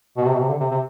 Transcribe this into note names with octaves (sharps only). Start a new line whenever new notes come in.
B2
C3
B2
C3
D3
C3
C3